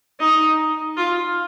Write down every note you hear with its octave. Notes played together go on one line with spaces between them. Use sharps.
D#4
F4